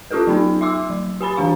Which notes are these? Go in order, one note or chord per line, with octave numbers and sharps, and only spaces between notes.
C#4 F4 G4 A4 B4
F#3 B3 D#4
E5 C6 D6 E6
F#3
G4 G#5 B5 A6
E3 D4 F5 C#6